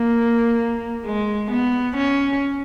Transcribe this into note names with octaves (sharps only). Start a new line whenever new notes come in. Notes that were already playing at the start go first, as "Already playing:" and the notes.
Already playing: A#3
G#3
B3
C#4